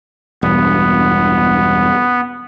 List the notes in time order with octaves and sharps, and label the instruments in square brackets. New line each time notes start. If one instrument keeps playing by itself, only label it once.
[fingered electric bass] E1 G2 [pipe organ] B3